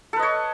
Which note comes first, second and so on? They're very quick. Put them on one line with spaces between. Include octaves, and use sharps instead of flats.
A4 B4 D#5 C#5